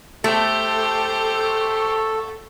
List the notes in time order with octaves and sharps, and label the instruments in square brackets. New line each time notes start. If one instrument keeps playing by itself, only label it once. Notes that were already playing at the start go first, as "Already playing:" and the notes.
[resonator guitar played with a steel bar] A3 [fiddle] G4 C5 [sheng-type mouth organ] A4